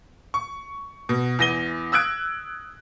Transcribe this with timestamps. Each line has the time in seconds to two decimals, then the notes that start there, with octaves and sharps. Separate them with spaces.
0.34 C#6
1.09 B2
1.39 E2 E3 A#6 D#7 G7
1.92 D#6 E6 F#6 G#6 D7